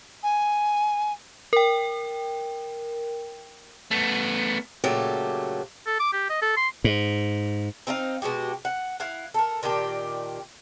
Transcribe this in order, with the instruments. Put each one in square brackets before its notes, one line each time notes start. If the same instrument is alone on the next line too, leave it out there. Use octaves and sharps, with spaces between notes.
[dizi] G#5
[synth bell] A#4 G5
[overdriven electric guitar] A3 B3
[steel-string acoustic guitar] A#2 C#3 F#3 A3 G4 A4
[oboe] A4
D6
G4
D#5
A4
C6
[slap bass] G#2
[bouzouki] C4 D#4 G#4 F5
B2 G#3 F#4 G4
F#5
E4 F5 F#5
A4 A#4
A#2 D#3 D4 G4